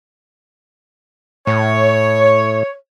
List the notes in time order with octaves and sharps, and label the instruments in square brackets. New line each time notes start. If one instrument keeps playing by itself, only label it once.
[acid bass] A2 [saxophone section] C#5